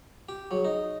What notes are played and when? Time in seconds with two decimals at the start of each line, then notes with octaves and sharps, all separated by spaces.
0.29 G4
0.51 F#3 G#4
0.65 D#4